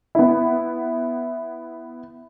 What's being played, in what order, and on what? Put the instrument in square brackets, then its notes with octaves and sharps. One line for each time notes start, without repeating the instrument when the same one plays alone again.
[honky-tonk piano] B3 E4